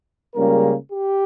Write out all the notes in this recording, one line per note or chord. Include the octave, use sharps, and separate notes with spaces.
C#2 C#3 G3 A#3 A#4
G4